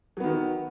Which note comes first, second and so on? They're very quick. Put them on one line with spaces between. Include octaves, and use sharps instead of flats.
F#3 B3 D#3